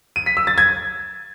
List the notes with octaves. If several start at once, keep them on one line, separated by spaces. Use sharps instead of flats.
D#7
B6
E6
A6
G#6